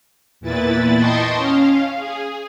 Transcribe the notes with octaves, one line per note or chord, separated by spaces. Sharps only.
E2 A#2 E4 B4 A6
D#5 G5 A5 C6 C#6 D#6
C#4 F5
G#4